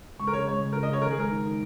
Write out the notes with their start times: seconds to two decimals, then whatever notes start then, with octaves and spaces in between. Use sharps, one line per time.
0.19 C#2 C#6
0.27 A#4
0.33 C#3 C#5
0.48 G#3 C#5
0.61 C#2
0.73 C#2 A#4
0.83 D#5
0.89 C#3 C#5
1.02 D#3 A#4
1.11 G#4
1.18 G#3 A#4
1.31 D#4
1.45 D#3